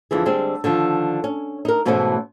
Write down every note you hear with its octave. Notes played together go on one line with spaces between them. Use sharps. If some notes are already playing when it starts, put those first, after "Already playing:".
F2 D3 E3 G#4
D3 G3 G#3 C4
D3 D#3 F3
C#4
D#4 A#4
G#2 B2 E3 A3 C#4 C5